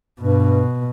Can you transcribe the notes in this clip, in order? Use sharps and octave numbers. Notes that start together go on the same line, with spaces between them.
G2 B2